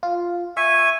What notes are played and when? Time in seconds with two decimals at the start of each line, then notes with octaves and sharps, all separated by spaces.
0.03 F4
0.57 E5 G#5 C#6